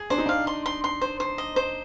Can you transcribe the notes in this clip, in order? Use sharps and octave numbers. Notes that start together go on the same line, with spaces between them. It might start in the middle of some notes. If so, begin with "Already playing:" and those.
Already playing: G#4
D4 C5
D#4
D4 F5
C6
C6
C6
C5
C5
D#5
C5